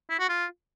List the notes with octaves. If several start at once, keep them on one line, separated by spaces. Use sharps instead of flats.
E4
F#4
F4